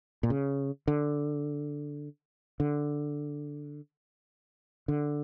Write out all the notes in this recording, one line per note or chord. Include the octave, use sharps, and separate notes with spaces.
A#2
C#3
D3
D3
D3